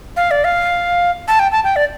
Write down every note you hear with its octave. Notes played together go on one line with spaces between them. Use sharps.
F5
D5
F5
A5
G5
A5
G5
D5